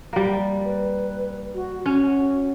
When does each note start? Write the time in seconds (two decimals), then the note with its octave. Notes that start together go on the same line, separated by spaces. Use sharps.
0.13 G3 A#3
0.65 B4
1.55 F#4
1.86 C#4 F#4